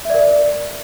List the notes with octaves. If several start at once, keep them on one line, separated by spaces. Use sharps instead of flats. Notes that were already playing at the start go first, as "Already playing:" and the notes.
A#4 D5 E5